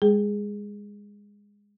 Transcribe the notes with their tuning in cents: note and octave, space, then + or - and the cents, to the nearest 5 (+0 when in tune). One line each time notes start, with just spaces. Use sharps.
G#3 -25 G#4 +0